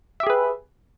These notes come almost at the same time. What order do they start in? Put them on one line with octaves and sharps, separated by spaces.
E5 G4 G#4 B4